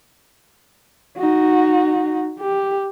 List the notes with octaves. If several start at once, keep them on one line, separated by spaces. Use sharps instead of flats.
D#4 F#4
G4